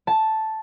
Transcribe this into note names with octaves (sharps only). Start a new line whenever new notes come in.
A5